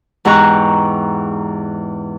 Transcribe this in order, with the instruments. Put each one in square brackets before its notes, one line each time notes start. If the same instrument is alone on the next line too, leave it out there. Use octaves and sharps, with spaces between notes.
[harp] E2 G#2 G4 A#5 C#6 F#6